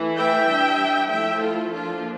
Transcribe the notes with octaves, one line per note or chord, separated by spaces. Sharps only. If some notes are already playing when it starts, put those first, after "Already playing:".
Already playing: E3 A3 E4
E5 G5
G3 D4
F3 A3 E4 E5 G5
F4 A4
F3 A#3 D4 F4